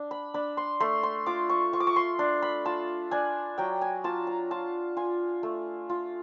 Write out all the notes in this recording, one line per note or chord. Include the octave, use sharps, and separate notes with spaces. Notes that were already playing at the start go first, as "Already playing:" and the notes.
Already playing: D4
B5
D4 B5
C6
A3 C6
C6
F4 D6
C#6
F4 C#6
D6
C#6
C6
D4
B5
F4 A5
D4 G#5
F#3 G5
G#5
F4 A5
A#5
F4 A5
F4 G#5
A3
F4